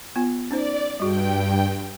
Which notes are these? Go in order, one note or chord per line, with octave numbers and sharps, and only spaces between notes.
B3 F4 G#5
C#4 D#4 C5 D5
G2 G3 F#4 G#4 G5